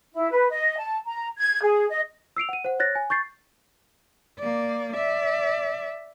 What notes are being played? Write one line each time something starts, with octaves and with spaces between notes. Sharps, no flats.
E4
B4
D#5
A5
A#5
G#6
G#4
D#5
E6 C7 D7 F7
F#5 D#7
C5 F#5
C#5 F#6 A6 A#6
G#5
C#6 G6 A6 C7
A#3 D5
D5 E5